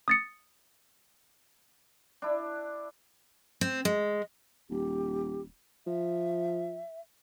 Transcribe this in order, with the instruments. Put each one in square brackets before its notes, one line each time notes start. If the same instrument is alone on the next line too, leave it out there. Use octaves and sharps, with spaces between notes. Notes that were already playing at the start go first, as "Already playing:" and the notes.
[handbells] D#6 A6 C#7
[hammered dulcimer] D4 E4
[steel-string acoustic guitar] C4
G#3
[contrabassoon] D#1 [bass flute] G4
[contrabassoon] F3 [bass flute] E5